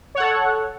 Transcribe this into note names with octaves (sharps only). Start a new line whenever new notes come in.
A4 C#5 F#5